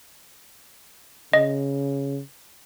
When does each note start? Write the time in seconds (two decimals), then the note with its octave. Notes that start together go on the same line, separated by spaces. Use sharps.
1.33 C#3 D#5